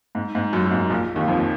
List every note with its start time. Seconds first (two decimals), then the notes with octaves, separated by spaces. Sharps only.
0.15 G#2
0.35 G#2
0.53 F#2
0.66 F#2
0.71 G#2
0.90 A#1 A#2
1.15 D#2 D#3
1.28 F2 F3
1.40 F3